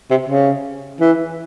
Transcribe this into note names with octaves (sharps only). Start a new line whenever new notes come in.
C3
C#3
E3